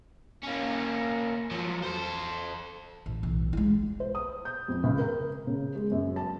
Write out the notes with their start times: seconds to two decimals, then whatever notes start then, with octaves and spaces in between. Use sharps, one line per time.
0.43 A#3 C#4
1.51 F3 F#3
1.83 A4 C5
3.06 A1
3.23 B1 E3
3.53 G#3 E4
4.00 C5
4.15 D#6
4.45 G6
4.68 F2
4.84 C#2
4.99 A#4
5.47 C#3
5.75 G#3
5.92 F#2
6.16 A5